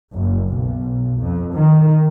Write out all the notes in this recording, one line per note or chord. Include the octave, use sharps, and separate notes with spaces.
F#1
B1
F2
D#3